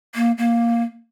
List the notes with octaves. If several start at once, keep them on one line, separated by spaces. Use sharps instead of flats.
A#3
A#3